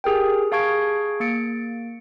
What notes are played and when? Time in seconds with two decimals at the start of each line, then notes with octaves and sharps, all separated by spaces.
0.04 G4 G#4 A#4 G5
0.52 G#4 F5 A5 C#6 G#6 D7
1.20 A#3 A6 C#7 D7